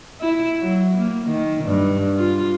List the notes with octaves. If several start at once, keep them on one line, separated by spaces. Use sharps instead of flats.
E4
F#3
A#3
D#3
G2
F4